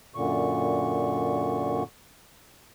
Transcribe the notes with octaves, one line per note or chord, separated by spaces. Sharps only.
F#2 A#2 D3 C#6